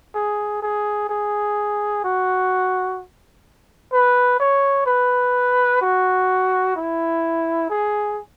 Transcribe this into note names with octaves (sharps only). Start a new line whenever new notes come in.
G#4
G#4
G#4
F#4
B4
C#5
B4
F#4
E4
G#4